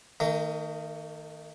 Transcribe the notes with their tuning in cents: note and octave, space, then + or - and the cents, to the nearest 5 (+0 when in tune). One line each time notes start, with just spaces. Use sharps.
D#3 +0 A3 +45